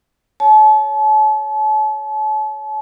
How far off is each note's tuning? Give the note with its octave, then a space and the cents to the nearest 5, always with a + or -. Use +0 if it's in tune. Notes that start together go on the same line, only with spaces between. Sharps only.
C#5 +10 A5 -40